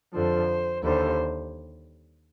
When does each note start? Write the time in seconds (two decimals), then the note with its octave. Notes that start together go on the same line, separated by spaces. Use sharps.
0.14 F2 D3 F3 C5
0.83 D#2 D3 G3 C5